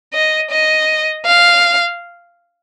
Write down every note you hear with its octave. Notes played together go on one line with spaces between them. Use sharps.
D#5
D#5
F5